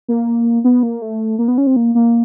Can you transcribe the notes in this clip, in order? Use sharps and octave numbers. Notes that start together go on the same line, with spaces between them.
A#3
B3
A#3
A3
A#3
B3
C#4
C4
A#3
A#3